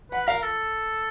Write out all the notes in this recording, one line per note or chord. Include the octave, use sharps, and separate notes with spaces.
B4 F#5
A#4 F5
A4